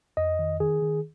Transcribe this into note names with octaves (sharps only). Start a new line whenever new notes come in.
F2 D#5
D#3
D#3 G#4
D#3